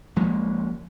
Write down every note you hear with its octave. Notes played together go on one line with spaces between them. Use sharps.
C#2 F3 G#3 A#3